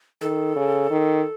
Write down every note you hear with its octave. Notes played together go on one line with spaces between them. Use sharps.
D#3 A4
C#3
D#3